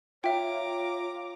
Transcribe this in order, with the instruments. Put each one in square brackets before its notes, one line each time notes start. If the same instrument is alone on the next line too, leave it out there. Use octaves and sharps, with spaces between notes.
[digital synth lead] F4 [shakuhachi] C#5 [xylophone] E5 G5 [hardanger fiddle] A#5 D6